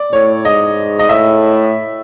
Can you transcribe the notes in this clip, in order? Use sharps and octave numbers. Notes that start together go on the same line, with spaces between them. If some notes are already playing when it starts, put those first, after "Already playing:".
Already playing: D5
A2 C#5
G#2 D#5
D#5
A2 E5